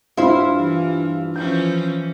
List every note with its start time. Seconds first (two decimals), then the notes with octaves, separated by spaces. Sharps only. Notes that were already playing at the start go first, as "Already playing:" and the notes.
0.17 G2 E4 F4 C5
0.57 E3
1.36 E3 F3 C#4 G6